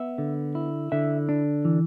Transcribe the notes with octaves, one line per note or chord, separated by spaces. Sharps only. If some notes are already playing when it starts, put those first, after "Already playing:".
Already playing: B3 E5
D3
E4
D3 E5
D4
E3